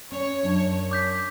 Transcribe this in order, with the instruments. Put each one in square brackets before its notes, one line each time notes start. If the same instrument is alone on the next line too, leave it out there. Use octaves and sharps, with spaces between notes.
[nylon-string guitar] C#4 [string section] C#5
[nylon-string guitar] F#2 D4 A5
[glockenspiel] D6 G6 B6